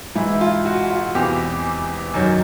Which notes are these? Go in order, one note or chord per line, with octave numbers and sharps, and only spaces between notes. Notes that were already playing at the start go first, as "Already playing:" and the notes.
G#2 E3 E4
F4
F#4
F4
E2 C3 E3 G4
F#2 D#3 F#3